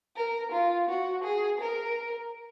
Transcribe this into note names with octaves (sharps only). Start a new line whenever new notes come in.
A#4
F4
F#4
G#4
A#4